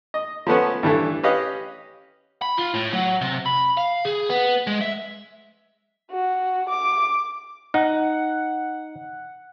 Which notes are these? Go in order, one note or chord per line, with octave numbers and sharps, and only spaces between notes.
D#5
F3 A3 B3 C#4
G2 E3 A3
C#4 G4 B4 D#5 F5
B5
F4
A2
F#3
C3
B5
F5
G#4
B3
G#3
E5
F#4
D6
D#4 F#5